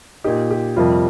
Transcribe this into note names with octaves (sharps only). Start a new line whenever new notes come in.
A#2 A#3 D#4 G4
G4
F2 C3 G3 A#3 F4